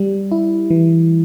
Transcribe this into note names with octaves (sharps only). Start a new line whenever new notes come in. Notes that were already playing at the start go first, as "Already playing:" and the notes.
Already playing: G3
E4
E3